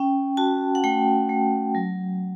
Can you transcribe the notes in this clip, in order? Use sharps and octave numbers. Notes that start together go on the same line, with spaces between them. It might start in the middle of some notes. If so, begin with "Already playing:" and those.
Already playing: C#4 G5
F#4 A5
F#5
A3 G5
A3
F#3